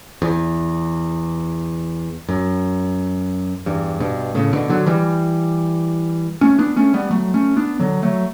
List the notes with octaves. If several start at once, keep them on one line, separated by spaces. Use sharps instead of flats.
E2
F#2
E2 G2
G2 B2
A2 C#3
B2 D3
D3 F#3
E3 G3
A3 C#4
B3 D4
A3 C#4
G3 B3
F#3 A3
A3 C#4
B3 D4
D3 F#3
F#3 A3